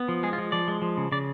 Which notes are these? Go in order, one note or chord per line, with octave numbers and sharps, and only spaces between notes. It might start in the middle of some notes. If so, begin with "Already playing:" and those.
Already playing: B3
F3
G#3 G#4
F4
F3
F3 D5
G#3
F3
C#3
C#3 D5